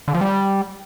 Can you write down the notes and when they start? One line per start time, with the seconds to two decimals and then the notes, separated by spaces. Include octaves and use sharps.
0.08 D3
0.14 F3
0.21 G3